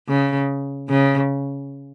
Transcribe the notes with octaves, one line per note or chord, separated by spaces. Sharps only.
C#3
C#3